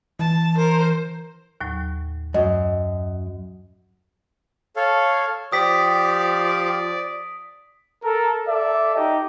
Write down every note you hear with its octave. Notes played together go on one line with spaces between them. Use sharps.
E3 A5
A#4 C5
D#2 A2 F#3
F#2 D#5
A4 C#5 F5
F3 G4 D5 D#6 B6
A4 A#4
A4 D5 E5
D#4 G4 D#5